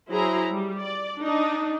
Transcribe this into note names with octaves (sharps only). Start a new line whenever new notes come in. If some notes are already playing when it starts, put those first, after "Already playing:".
F#3 E4 G#4 C5 A#5
G3
D5
D4 D#4